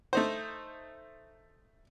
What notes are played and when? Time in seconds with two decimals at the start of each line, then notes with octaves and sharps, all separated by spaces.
0.13 A3 D#4 C5